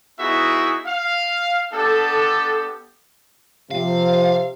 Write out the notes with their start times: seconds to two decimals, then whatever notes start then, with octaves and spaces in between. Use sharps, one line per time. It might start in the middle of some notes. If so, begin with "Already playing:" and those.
0.19 B3 D#4 E4 F#4 G#4 E5
0.86 F5
1.73 B3 D4 G4 A4
3.71 C3 F3 F5